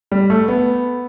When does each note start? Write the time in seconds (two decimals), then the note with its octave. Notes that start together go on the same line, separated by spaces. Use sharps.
0.12 G3
0.30 A3
0.48 B3